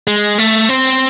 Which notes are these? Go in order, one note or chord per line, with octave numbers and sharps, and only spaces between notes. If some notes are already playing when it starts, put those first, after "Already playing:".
G#3
A3
C4